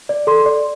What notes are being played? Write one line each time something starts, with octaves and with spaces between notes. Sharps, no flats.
D5
A4 C6
D5